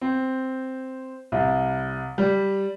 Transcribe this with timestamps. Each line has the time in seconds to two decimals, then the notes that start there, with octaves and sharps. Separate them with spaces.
0.01 C4
1.32 C2
2.18 G3